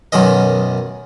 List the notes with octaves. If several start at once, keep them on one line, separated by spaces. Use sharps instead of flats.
B1 F#2 D#3 D#5